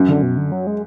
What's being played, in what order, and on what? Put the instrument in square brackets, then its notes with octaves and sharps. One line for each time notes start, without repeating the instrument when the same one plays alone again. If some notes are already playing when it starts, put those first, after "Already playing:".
Already playing: [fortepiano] F#2
[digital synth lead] D3
B2
D3
F#3
G#3